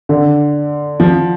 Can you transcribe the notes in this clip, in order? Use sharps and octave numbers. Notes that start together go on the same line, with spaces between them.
D3
F3